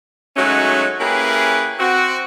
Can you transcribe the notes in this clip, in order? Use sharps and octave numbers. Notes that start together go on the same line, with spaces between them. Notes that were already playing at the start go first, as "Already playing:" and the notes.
F#3 G#3 A3 C#4 D#4 F#4
A#3 C#4 E4 G4 G#4 B4
C4 F#4